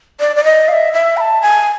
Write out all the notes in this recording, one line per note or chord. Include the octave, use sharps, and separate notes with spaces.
D5
D5
D#5
F5
E5
E5
B5
A5
G#5